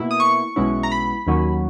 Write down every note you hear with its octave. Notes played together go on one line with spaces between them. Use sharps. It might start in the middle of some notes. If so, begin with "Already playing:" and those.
Already playing: B2 A#3 E4
D#6
C#6
B1 B2 G#3 C#4 E4
A#5
B5
D#2 D#3 F#3 A#3 C#4